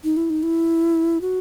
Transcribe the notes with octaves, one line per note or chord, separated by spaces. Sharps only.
D#4
E4
D#4
E4
F#4